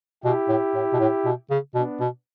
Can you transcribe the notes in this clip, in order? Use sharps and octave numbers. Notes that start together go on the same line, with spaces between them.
B2 E4 G4
A2
A2
B2
A2
B2
C#3
B2 B3 D4
B2